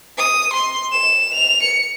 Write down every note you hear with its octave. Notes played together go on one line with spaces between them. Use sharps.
D#6
C6
E7
F7
C#7